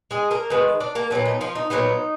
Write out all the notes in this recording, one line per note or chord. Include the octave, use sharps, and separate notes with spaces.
G#3 G#4
A#3 A#4
D#3 G#3 B3 B4
D4 D5
A#3 A#4
A#2 F#3 B3 D4
D#4
F3 F4
D#4
A#2 F#3 B3 D#4